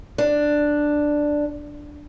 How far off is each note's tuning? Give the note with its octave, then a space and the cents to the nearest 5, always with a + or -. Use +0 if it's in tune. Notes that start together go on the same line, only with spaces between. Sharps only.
D4 +5